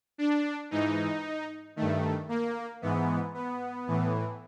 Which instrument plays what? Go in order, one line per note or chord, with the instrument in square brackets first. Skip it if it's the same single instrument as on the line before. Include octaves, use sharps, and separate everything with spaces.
[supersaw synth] D4
G#2 E3 D#4
G2 D#3 A3
A#3
G#2 E3 B3
B3
A2 E3